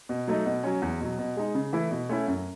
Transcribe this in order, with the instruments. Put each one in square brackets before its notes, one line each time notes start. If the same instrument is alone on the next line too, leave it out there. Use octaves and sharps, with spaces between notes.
[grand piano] B2
F#3 A3 D#4
B2
F#3 C#4
E2
B2 F#3
B2
G#3 D#4
C#3
E3 A3 E4
B2
A3 C#4 E4
F#2